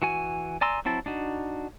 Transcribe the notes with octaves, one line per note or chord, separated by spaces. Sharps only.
E3 F#4 G#5
D5 G#5 A#5 C6 E6
F#3 C4 E4 A5
D4 D#4 F#4